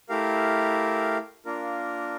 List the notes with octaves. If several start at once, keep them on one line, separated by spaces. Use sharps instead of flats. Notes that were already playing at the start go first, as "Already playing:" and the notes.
A3 E4 G4 A#4 F5
A#3 D4 F4 A#4